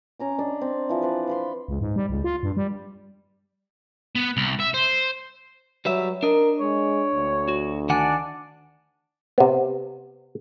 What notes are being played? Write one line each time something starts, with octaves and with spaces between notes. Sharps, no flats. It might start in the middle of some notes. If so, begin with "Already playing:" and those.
C#4 A#5 D6
D4 D5 D#5
C4
E3 F3
B4 C5 D5
F5 B5 C6
C#2
G#2
G3
C#2
F4
G2
G3
B3
C2
E5
C5
F#3 G3 B4 E5
D4 A#4 D#5
G#3 C#5
D2
F#4
D#3 D4 F#5 G#5
C3 B3